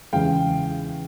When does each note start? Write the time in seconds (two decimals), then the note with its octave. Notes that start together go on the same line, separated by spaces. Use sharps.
0.13 E2 C#3 E3 G#3 F5 G5